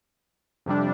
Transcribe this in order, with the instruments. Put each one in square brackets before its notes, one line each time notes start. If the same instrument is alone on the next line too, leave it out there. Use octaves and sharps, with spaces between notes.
[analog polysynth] F2 C3 G3 D4